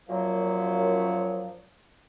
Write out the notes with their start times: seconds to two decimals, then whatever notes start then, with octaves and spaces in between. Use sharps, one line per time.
0.08 F#2 A#2 F3 F#3